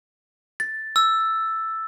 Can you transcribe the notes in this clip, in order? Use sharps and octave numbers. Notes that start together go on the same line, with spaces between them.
A6
E6